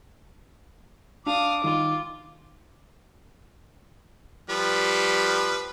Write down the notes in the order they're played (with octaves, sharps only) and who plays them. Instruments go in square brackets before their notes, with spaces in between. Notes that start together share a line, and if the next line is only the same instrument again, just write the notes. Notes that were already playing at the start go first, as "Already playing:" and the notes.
[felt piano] D4 [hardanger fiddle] F5 D#6 [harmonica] D6
[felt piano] D#3 [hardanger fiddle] F4
[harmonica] F3 G3 B4